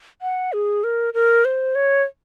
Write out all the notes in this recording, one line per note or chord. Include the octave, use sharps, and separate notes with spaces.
F#5
G#4
A#4
A#4
C5
C#5